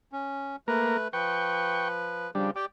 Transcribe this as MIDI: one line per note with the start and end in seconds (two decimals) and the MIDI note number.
0.12 0.56 61
0.68 1.08 57
0.68 0.97 58
0.68 0.97 70
0.68 1.08 71
1.13 2.31 53
1.13 2.31 71
1.13 1.88 79
1.13 1.88 85
2.35 2.51 49
2.35 2.51 53
2.35 2.51 55
2.35 2.51 62
2.56 2.65 67
2.56 2.66 74
2.56 2.65 79